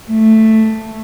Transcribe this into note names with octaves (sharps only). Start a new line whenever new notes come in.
A3